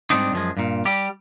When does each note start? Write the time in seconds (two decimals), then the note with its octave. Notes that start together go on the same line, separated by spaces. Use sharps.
0.10 G#2 B2 G3 C4 D4 D#4
0.33 F#2 F3 G#3
0.57 G2 A#2
0.85 G3 G4